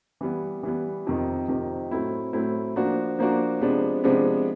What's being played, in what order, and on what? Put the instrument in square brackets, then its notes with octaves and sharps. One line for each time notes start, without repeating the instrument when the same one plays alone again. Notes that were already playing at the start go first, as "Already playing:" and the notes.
[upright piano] E3 G3 B3
E3 G3 B3
F2 C3 D#3
F2 C3 D#3
A2 F#3 A3 C4 E4
A2 F#3 A3 C4 E4
F3 A#3 D4 F#4
F3 A#3 D4 F#4
C3 F3 G#3 B3 D4
C3 F3 G#3 B3 D4